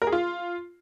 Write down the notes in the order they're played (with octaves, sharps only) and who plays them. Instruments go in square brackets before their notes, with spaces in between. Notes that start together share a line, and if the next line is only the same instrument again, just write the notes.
[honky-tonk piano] A#4
G#4
F4